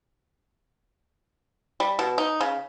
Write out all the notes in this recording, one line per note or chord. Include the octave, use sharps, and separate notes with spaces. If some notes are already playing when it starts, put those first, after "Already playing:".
G3
B2
D#4
C#3